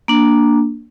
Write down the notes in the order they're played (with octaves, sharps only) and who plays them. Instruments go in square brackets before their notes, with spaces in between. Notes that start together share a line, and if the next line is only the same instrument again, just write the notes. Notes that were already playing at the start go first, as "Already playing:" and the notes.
[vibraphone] A#3 D4